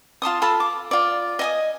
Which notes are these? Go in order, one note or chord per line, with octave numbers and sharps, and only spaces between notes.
F4 A5 C6 D#6
F4 A4 A5 B5
D6
F4 D5
D#5 G#5 D#6